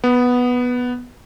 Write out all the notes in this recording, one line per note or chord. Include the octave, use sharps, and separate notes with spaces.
B3